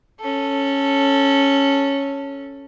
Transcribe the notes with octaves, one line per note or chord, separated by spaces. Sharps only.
C#4 A4